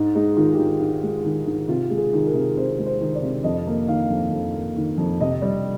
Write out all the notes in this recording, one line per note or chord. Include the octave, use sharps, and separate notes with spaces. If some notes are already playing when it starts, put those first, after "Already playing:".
Already playing: G#2 D#4
G#3 D#4
D#3 F4
G4
G#2 F4
G#2
G#3
D#3
G#2
C3 F4
G#3
G#4
D#3
A#4
C3
C3 C5
G#3
C5
D#3
D5
C3
F2 D#5
A#3
D#3 F5
F2
F2
A#3
D#3
F2
C3 D#5
G3